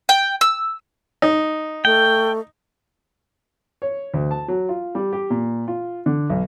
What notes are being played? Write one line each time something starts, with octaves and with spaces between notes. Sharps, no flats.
G5
E6
D#4
A3 G5
C#5
D2
A5
F#3
F4
G3
G4
A#2
F4
D3
B1